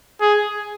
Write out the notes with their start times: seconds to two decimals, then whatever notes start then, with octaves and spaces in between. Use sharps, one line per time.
0.21 G#4